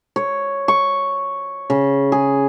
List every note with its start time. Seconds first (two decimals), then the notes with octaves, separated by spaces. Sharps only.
0.16 C#5
0.68 C#6
1.70 C#3
2.12 G#4